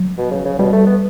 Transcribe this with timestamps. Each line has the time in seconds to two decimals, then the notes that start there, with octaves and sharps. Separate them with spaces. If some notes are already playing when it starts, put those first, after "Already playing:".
Already playing: F#3
0.18 B2
0.32 C#3
0.45 C#3
0.59 B2 G3
0.73 A3
0.86 B3